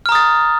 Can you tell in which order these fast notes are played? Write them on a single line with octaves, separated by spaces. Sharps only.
F6 A#5 D#6 A6